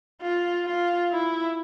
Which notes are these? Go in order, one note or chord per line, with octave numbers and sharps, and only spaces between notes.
F4
F4
E4